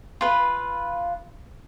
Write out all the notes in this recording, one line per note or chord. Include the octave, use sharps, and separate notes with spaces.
F4 B4